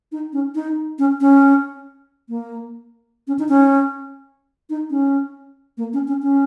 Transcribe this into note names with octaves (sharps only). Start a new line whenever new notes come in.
D#4
C#4
D#4
C#4
C#4
A#3
C#4
D#4
C#4
D#4
C#4
A#3
C#4
C#4
C#4